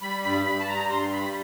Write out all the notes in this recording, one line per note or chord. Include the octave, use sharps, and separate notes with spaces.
G3 B5
G2 B5
G2 B5
A5
G3 A#5
G2 C6
G3 B5